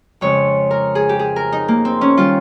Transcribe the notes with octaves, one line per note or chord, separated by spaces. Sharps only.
F2 C#3 G#3 C#5
A#4
G#4
G4
G#4
A#4
D#4
A#3
C4
C#4
D#3 G3 F4